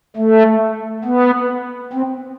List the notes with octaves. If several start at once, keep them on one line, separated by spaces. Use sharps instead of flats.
A3
B3
C4